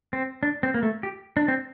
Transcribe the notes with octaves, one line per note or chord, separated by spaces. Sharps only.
C4
D4
C4
A#3
A3
G4
D4
C4